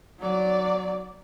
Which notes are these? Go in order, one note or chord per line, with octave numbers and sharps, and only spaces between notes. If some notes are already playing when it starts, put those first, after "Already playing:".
F#3 D5